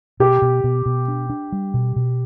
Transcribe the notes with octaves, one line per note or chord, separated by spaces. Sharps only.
B2 G4
B2
B2
B2
D4
D4
G3
B2
B2